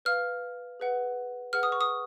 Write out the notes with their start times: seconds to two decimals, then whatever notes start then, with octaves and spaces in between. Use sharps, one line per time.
0.05 B4 F5 F6
0.80 G#4 B4 F#5
1.53 G#4 B4 F#5 F6
1.63 D#6
1.72 C#6
1.81 D#6